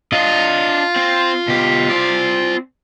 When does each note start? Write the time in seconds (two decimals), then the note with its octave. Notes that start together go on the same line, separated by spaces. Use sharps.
0.13 D4 F4 D#5
0.96 C4
1.48 B2 G4
1.90 C4 D5